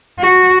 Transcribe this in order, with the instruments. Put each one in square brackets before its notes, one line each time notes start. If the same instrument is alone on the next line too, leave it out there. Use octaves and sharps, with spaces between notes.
[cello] F#4